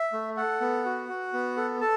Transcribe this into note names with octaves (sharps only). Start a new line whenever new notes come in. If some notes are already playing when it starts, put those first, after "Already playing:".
Already playing: E5
A3
A4 F#5
B3
F#4
F#4
B3
A4
A4 A5